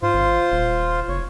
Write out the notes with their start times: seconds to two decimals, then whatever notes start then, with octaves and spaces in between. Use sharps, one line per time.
0.02 G#2 F4 C5
0.14 G#1
0.52 D#1
1.08 F#1 C#5